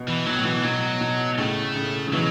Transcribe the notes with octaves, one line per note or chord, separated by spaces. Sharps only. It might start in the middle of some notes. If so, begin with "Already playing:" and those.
Already playing: B2
E3
B2 F#3
A2
B2 E3
B2 F#3
B2
A2 C#3 A3
A2 C#3
C#3
B2 E3 F#3